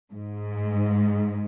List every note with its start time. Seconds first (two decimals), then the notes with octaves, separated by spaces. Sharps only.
0.12 G#2